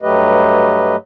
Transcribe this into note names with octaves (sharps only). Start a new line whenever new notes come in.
G2 F#3 A3 G4 B4 D#5